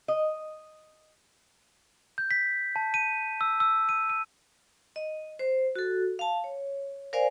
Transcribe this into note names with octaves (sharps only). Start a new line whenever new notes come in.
D#5
G6
B6
A5
D#7
E6
E6
D#7
D#7
D#5
C5
F#4 A4
F5 A5
C#5
A#4 C5 D5 F5 G#5